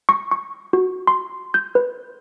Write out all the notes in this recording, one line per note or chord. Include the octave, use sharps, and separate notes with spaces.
C#6
C#6
F#4
C6
G6
B4